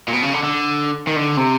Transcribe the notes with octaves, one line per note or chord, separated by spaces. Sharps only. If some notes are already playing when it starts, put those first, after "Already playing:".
A#2
B2
C#3
D3
D3
D#3
D3
C3